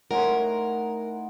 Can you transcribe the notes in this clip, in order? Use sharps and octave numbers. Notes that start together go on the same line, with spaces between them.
A2 D#4 A#4 F#5 G#5 C6